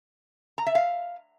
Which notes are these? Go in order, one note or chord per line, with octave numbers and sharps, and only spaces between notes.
A#5
E5
F5